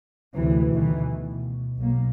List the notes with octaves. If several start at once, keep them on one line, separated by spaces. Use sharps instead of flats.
D2 C3 E3
D2 B2 D#3 E3
B2
B1 A#3